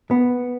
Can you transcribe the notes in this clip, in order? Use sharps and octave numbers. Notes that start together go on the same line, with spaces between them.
B3